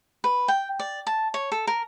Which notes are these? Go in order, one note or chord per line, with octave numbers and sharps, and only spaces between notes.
B4
G5
D5
A5
C#5
A4
A#4